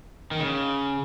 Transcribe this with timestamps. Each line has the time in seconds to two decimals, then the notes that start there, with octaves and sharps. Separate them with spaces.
0.31 D#3
0.40 C#3